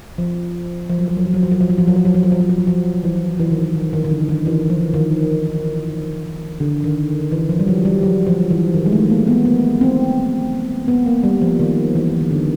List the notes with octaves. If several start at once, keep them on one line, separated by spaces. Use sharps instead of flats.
F3
F3
F#3
F3
F#3
F3
F#3
F3
F#3
F3
F#3
F3
F#3
F3
F#3
F3
F#3
F3
F#3
F3
F#3
F3
E3
E3
D#3
E3
D#3
D#3
D#3
D3
D#3
E3
F3
D#3
D3
D#3
E3
F3
G3
F#3
G3
F#3
F3
E3
D#3
G#3
A3
A#3
B3
B3
C4
B3
A#3
G3
F3
D#3
E3
E3
D#3
D3